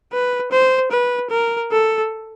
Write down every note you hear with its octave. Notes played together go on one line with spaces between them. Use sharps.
B4
C5
B4
A#4
A4